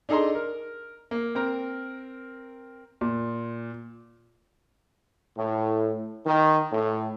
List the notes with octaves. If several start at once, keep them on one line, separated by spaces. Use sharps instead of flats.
D4 D#4 G#4 A4 A#5 C6
A#4
A#3
C4 A#4 A#5
A#2
A2
D#3
A2